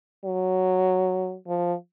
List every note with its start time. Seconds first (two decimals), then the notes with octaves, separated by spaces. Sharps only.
0.25 F#3
1.48 F3